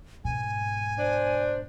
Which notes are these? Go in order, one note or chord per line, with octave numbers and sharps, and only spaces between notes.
G#2 B2 G#5
D4 C5